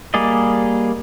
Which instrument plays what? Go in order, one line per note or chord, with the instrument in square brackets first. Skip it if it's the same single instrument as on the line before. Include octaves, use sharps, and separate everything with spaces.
[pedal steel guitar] G3 A#3 G#4 D5 D#5